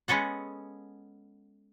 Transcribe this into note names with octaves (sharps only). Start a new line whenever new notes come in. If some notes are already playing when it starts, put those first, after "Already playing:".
G#3 B3 C#4 A4 F#5